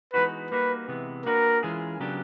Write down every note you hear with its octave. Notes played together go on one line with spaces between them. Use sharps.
E3 G#3 B3 D#4 F#4 B4
G3 A#3 D#4 F#4 B4
C3 E3 G#3 B3
A#3 D4 F#4 A#4 B4
E3 G#3 C#4 F4 G#4
C#3 F#3 B3 D4 G4